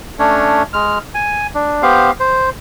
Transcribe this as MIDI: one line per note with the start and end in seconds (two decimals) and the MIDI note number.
0.19 0.63 57
0.19 0.63 61
0.19 0.63 62
0.19 0.63 73
0.73 0.99 56
0.73 0.99 89
1.15 1.47 80
1.55 1.82 62
1.82 2.11 59
1.82 2.11 67
1.82 2.11 72
1.82 2.11 77
2.20 2.50 72